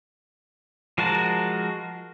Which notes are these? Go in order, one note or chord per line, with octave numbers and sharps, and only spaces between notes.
F3 G#3 F#4 A#4 A5